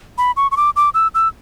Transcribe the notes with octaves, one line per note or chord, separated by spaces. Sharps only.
B5
C#6
C#6
D6
D6
E6
E6